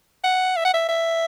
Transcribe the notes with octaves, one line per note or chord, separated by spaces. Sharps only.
F#5
E5
F#5
E5
E5